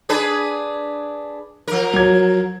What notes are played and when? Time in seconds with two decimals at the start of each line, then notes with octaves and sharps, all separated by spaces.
0.09 D4 G#4 B4
1.68 F3 A#4
1.93 F#3 G#6